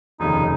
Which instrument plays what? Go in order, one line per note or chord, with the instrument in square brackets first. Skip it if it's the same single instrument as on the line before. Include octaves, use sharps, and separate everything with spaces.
[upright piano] F1 D#2 C#3 [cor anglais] D#4